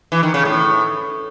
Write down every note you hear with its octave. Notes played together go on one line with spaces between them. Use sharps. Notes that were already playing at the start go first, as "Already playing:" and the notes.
E3
D#3
C#3
A2